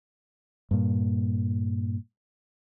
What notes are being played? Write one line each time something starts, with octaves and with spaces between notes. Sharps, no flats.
G2 A#2